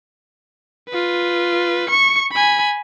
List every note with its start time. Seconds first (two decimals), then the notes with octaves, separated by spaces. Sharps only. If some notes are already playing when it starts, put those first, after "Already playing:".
0.89 F4 B4
1.89 C#6 C#7
2.32 G#5 B5